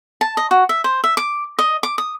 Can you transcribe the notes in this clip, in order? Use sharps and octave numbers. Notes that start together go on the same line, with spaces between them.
A5
D#5
F#4
E5
C5
E5
D6
D#5
D6
D#6